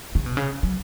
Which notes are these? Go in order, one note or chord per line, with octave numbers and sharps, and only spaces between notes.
C#3
B2
C#3
F#3